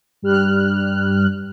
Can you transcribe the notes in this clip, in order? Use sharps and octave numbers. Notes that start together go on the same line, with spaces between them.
G2 G3 F6 F#6